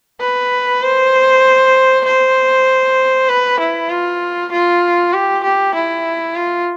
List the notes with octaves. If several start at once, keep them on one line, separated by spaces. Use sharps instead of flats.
B4
C5
C5
B4
E4
F4
F4
G4
G4
E4
F4